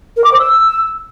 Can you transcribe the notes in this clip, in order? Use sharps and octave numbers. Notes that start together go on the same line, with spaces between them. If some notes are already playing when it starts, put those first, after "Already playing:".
A#4
D6
C5
E6